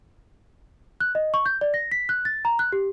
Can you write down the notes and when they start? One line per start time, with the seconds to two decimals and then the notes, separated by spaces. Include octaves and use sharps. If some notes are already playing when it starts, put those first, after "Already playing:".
1.00 F#6
1.15 D#5
1.34 C#6
1.46 G6
1.61 D5
1.74 A#6
1.92 B6
2.09 F#6
2.25 A6
2.45 A#5
2.59 F#6
2.72 G4